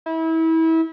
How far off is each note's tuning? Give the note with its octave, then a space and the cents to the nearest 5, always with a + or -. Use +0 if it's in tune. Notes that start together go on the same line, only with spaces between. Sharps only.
E4 -30